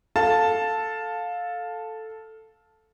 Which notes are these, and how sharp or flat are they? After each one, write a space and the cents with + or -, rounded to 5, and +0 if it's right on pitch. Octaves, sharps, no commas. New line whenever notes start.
A4 +0 F5 +15 A5 +0